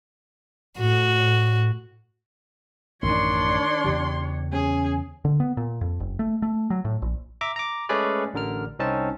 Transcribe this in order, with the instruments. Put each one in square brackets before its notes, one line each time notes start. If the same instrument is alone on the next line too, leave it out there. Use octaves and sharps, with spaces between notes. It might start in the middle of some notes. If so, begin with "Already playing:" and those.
[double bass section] A2 [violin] F#4
[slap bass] A1 F#2 [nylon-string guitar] D#3 [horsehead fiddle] D4 C#5 [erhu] C6
[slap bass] E2 C#3 E3 [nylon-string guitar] G4
[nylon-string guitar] C#4 [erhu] G#4
[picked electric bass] D3
B3
A#2
F2
F#1
A3
A3
F#3
A2
A#1
[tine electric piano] E5 A#5 D6
A#5 D6
G#3 A3 C#4 G#4 B4 D5
A1 D3 A#4 F6
C2 C4 C#4 D#4 A5